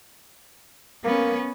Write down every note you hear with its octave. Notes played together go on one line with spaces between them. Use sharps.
A#3 B3 C#4